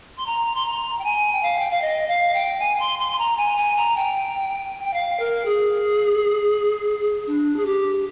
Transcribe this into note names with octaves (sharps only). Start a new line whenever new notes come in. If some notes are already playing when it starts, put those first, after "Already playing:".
C6
A#5
C6
A#5
G5
G#5
G5
F5
G5
F5
D#5
F5
G5
G#5
C6
C6
C6
A#5
G#5
G#5
A#5
G5
G5
F5
A#4
G#4
D4
G#4
G4